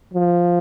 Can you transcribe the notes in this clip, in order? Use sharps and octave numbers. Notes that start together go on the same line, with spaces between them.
F3